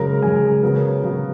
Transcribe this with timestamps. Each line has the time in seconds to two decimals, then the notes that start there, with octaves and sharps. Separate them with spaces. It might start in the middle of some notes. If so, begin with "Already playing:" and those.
Already playing: F#2 C#3 G#3 A#4 A#5
0.22 F#2 C#3 G#3 G#4 G#5
0.63 C#3 F#3 B3 A#4
1.03 C#3 F#3 B3